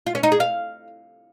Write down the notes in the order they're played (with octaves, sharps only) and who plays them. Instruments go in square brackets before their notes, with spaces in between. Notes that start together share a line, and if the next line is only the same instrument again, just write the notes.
[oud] F4
C#4
D#4
G#4
F5